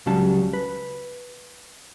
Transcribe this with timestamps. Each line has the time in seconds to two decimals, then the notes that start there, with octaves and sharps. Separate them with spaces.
0.06 C#2 C#3 F#3 G3 A5
0.53 B4